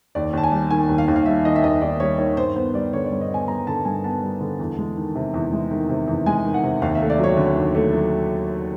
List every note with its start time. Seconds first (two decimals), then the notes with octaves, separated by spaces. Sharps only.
0.15 D#2 D5
0.33 D#2 A5
0.43 G#5
0.52 G3
0.71 D#3 G#5
0.89 D#2
0.98 F5
1.08 D#2
1.16 F5
1.26 G3 E5
1.45 D#3 D#5
1.56 E5
1.63 D#2 D#5
1.81 D#2 D5
2.00 G3 C#5
2.18 D#3 C#5
2.37 G2 C5
2.56 B3 C5
2.74 G3 D5
2.93 D3 C#5
3.06 D5
3.12 G2
3.21 D#5
3.30 B3 G#5
3.48 G3 A#5
3.67 D3 A5
3.85 G2 G#5
4.04 B3 A5
4.23 G3
4.41 D3
4.59 E2
4.78 G#3
4.97 D#3
5.15 C3
5.34 E2
5.53 G#3
5.71 D#3
5.89 C3
6.08 E2
6.26 G#3 G#5
6.45 D#3
6.54 F#5
6.63 C3
6.82 D#2 F5
6.95 E5
7.01 A3
7.10 D5
7.19 F#3 C#5
7.37 D3
7.56 D#2
7.75 A3
7.93 F#3